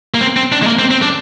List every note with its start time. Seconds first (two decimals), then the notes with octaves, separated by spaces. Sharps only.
0.14 A#3
0.21 C4
0.37 C4
0.52 D4
0.62 G#3
0.67 A#3
0.79 C4
0.91 C4
1.02 D4